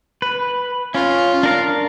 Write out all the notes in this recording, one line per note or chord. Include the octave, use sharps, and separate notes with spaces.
B4
C#4 F4
D4 A#4 F5